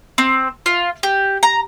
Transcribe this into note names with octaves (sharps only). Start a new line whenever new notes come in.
C4
F4
G4
A#5